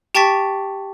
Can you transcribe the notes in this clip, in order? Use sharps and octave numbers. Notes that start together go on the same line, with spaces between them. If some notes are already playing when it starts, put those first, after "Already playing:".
G4 G5 A5 C#6 A6 B6